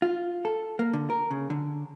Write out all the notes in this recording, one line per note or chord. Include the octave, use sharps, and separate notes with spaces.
F4
A4
A#3
D3
A#4
C#3
D3